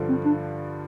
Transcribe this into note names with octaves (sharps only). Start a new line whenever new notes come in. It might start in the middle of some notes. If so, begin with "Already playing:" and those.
Already playing: G2 D3 F3
C4
D4